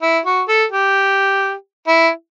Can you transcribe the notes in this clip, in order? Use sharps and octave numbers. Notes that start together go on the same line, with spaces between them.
E4
F#4
A4
G4
E4